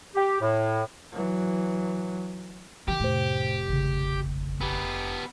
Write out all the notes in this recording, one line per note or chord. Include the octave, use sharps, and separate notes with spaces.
G4
A2
E3 F#3
D#3 E3 G4 G5
F1 A2 A3 C5
G#1 C#3
B3 G4